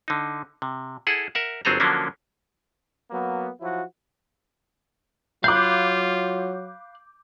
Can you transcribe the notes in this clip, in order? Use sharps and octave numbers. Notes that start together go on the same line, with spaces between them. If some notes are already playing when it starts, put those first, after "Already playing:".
D3 D#4
C3
E4 G#4 A4 F#5
A#4 E5 F#5
G1 F#3 C4 G#4 A4 A#5
D3 F3 F#3 A#3 C#4 D4
F#3 A#3 B3
F3 F#3 E4 F#4
F#3 F4 F5 B5 D6 F#6 G6